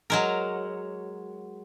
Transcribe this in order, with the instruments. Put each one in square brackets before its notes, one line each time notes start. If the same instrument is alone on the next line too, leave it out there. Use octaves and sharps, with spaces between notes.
[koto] F#3 G#3 A#4